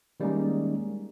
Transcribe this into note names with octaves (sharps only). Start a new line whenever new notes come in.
D#3 G3 G#3 A#3 C#4 D#4